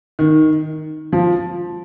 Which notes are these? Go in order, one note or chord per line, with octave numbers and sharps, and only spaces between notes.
D#3
F3